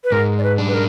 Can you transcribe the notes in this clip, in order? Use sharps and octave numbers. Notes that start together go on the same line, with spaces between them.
B4
G#2 A#4
D5
B4
D4
B4
A#4